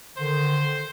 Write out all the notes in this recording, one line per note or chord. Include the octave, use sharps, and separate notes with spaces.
D3 D#3 C5